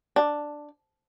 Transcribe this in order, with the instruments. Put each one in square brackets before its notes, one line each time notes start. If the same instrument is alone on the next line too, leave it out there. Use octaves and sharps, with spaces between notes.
[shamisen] D4